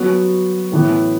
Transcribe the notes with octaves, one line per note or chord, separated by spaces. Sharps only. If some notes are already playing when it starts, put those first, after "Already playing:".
Already playing: F#3 B3 F#4
A2 E3 B3